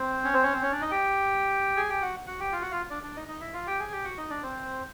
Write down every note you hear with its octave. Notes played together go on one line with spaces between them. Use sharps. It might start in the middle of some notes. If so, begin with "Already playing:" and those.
Already playing: C4 C5
C#4 C#5
C4 C5
C#4 C#5
C4 C5
C#4 C#5
D4 D5
D#4 D#5
G4 G5
G#4 G#5
G4 G5
F#4 F#5
F#4 F#5
G4 G5
F4 F5
F#4 F#5
F4 F5
D4 D5
D4 D5
D#4 D#5
D#4 D#5
E4 E5
F4 F5
G4 G5
G#4 G#5
G4 G5
F#4 F#5
D#4 D#5
D4 D5
C4 C5